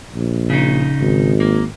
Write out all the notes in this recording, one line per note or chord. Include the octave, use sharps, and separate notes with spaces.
A#1
C#3 D#4
G#1
A#3